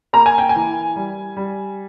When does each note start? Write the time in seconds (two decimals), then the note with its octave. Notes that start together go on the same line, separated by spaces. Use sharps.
0.13 A#3 A#5
0.26 G#5
0.38 G5
0.49 G#5
0.55 E3
0.96 G3
1.37 G3